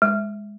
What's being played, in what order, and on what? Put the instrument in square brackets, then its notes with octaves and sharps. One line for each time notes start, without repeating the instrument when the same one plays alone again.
[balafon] G#3